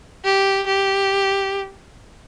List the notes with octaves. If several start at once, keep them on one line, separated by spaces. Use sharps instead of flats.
G4
G4